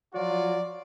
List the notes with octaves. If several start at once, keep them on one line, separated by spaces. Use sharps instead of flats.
F3 F#3 F4 F#4 D5